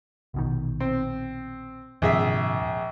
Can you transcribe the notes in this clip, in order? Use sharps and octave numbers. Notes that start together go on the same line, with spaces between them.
A#1 B2 D#3
C4
A#1 D#2 G#2 C3 G#4 E5